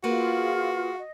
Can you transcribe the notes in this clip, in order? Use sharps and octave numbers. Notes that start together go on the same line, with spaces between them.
A#3 F4 F#4 G#4 B4 F5
D#5